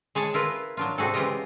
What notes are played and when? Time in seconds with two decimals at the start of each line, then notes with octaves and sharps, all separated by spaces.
0.15 G#3 G#4 C#5 A5
0.34 E4 F4 A#4 B4
0.77 F#3 D4 F4
0.98 C3 C4 F#4 G#4 A4
1.14 C#3 E3 G#3 F4 G4 D#5